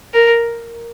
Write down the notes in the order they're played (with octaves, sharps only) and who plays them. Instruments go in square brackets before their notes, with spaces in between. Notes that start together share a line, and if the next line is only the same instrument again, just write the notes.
[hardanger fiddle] A#4